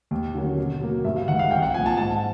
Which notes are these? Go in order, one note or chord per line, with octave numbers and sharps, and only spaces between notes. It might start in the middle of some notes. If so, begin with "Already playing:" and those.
D#2
D3 F#3 A#3 C#4
B2
F#3 A#3
G2 E5
F5
D#3 G#3 F#5
F5
C2 G5
F#5
A#2 F3 G#5
A5
G#2 A5